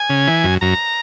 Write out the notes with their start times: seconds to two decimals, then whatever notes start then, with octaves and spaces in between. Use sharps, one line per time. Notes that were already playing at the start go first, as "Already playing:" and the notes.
Already playing: G#5
0.10 C#3
0.27 E3
0.44 F#2
0.61 F#2 A#5